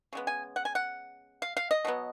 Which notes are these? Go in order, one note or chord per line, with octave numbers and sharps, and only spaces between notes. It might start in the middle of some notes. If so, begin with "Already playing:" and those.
C#3 G#3 B3
G#5
F#5
G#5
F#5
F5
F5
D#5
B2 F#3 B3